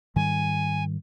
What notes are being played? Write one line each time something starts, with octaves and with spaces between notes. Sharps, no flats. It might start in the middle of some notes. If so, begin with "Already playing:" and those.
G#2 D#3 G3 G#5